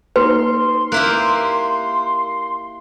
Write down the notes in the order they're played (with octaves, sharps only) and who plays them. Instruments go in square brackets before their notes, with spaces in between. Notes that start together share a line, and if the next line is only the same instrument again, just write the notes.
[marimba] A#3 D#4 [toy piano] B4 [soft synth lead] C6
[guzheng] A#3 E4 G4 [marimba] F#6